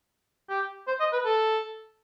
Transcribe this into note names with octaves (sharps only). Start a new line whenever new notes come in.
G4
C5
D#5
B4
A4